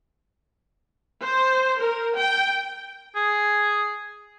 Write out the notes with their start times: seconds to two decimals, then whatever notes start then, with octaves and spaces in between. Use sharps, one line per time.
1.24 C5
1.80 A#4
2.18 G5
3.16 G#4